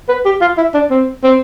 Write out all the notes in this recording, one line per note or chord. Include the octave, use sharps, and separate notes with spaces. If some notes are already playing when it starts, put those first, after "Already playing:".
B4
G4
F4
E4
D4
C4
C4